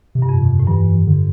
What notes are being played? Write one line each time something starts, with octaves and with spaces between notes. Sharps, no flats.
C3
G2
F2
C3
A2
G2 E3
D3